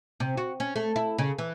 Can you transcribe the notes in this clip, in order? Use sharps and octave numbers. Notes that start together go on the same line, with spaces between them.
C3
F#4
C#4
A3
E4
C#3
E3